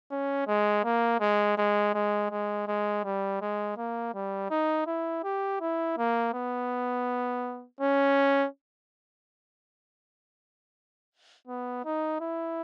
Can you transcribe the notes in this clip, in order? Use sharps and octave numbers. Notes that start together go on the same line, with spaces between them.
C#4
G#3
A#3
G#3
G#3
G#3
G#3
G#3
G3
G#3
A#3
G3
D#4
E4
G4
E4
A#3
B3
C#4
B3
D#4
E4